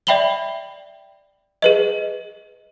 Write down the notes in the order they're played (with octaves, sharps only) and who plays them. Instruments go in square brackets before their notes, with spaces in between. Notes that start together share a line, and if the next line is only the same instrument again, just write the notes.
[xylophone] D5 E5 G5 B5 F#7 G7
G#4 B4 D#5